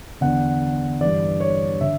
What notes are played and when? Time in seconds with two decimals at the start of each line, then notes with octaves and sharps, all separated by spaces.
0.21 E2 D3 F#5
1.01 G2 E3 D5
1.40 C#5
1.81 D3 E5